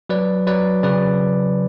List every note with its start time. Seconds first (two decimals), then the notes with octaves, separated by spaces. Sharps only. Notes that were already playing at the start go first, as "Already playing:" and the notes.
0.09 F#3 B4 D5
0.47 F#3 B4 D5
0.83 C#3 B4 D5